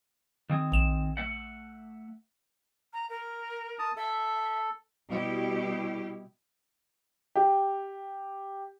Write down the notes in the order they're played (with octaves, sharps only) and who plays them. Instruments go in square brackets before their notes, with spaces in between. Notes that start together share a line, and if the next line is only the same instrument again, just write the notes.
[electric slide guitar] D#3 C4 G#4
[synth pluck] A#1 E7
[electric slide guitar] A3 E5 F#5
[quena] A#5
A#4
[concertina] A5 D#6
[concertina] A4 [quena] E5
[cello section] B2 G3 E4 G4
[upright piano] G4